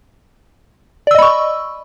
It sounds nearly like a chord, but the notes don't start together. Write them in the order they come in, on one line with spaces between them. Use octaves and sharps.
D5 E6 D#5 B5 C#6